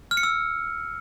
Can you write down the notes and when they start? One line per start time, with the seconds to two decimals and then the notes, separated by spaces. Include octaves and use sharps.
0.11 F6
0.17 C#7
0.23 E6